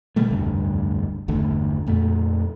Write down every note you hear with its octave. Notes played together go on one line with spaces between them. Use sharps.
B2 D3 G3 A3
F1 D2 G2
G1 E2 D3 A3
F2 A#2 A3